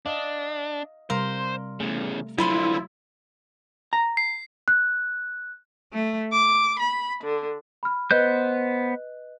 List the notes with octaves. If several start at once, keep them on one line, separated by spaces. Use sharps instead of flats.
D4 D#5 F5
C3 G3 A#4 C5 F5 C6
E2 C#3 A3
D3 F3 F#3 E4 F4 B5 C6
A#5
C7
F#6
A3
D6
B5
D3
B5 F6
B3 B4 C5 D#5 F#6 G6